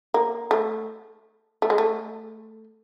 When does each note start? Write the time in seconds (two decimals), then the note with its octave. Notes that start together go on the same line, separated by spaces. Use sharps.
0.14 A#3
0.51 A3
1.62 A3
1.70 G#3
1.78 A3